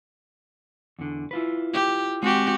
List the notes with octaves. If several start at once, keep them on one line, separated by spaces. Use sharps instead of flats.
E2 D3
E4 F4 B4
G4
G#3 C4 F#4 G4